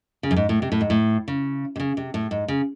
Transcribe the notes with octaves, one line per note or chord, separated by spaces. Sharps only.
C#3
F#2
G#2
A2
C3
A2
G#2
A2
C#3
C3
C#3
C3
A2
G#2
C#3